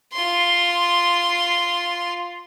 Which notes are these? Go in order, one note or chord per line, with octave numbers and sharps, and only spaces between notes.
F4 C6